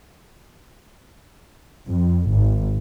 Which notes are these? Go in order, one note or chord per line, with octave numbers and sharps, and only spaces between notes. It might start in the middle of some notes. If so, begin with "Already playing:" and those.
F2
G#1